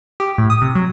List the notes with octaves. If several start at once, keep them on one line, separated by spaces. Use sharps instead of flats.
G4
A2
D#6
C3
F#3